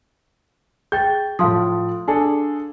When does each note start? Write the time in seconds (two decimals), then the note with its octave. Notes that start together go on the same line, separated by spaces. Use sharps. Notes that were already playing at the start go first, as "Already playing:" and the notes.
0.92 G#4 G5 G6 A6
1.39 A2 F3 F5 C6 D#6
2.07 D4 G#4 A4